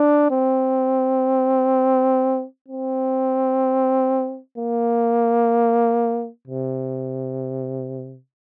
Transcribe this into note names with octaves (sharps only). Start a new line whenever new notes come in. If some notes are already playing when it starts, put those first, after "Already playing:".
Already playing: D4
C4
C4
A#3
C3